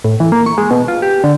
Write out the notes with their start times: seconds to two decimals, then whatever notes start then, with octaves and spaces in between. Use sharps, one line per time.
0.04 A2
0.20 E3
0.32 A#3
0.46 C#6
0.58 G#3
0.71 B2
0.88 F4
1.02 G4
1.24 D3